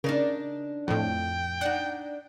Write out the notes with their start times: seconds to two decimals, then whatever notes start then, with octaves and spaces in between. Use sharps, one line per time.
0.04 C#3 D4 D#4 A#4
0.88 F2 A2 G5
1.61 D4 D#4 F#5